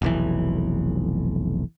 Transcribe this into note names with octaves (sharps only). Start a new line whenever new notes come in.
F1 B1 E3